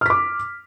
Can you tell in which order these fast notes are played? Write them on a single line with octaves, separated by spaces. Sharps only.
F6 B6 D6